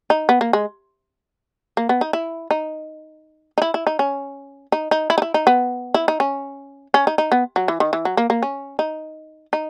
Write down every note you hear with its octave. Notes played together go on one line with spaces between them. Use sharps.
D#4
B3
A#3
G#3
A#3
B3
D#4
E4
D#4
D#4
E4
E4
D#4
C#4
D#4
D#4
E4
D#4
E4
D#4
B3
E4
D#4
C#4
C#4
D#4
D#4
B3
F#3
E3
D#3
E3
F#3
A#3
A#3
C#4
D#4
D#4